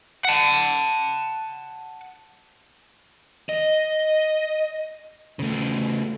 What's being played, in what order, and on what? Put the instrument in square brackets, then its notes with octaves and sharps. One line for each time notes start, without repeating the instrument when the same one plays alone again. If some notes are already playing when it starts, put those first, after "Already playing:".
[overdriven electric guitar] F#5 A5
[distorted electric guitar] D#5
C#3 A3